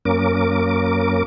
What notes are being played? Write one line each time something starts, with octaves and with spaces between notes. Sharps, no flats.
F#2 A#3 C#4 A#4 D6